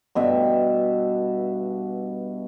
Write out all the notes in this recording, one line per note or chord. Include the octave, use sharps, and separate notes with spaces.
G2 B2 E5